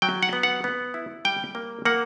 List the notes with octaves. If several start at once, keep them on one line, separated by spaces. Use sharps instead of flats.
F#3 G5
F#5
B3
F#5
B3
E4
G3 G5
A#3
A#3 F#5